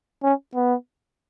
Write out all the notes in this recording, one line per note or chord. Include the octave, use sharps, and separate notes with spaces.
C#4
B3